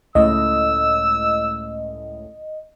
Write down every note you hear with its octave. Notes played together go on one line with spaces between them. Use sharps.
C#2 A2 D#5 E6